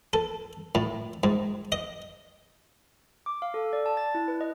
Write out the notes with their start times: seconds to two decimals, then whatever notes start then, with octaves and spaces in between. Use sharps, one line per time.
0.13 A4
0.75 A2
1.23 G#2
1.72 D#5
3.26 D6
3.42 F5
3.54 A4
3.73 D5
3.86 A5
3.97 A6
4.15 E4
4.28 B4
4.41 D#5